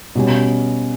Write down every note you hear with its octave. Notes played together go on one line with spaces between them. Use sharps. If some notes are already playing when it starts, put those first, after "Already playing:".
B2 G3 C#4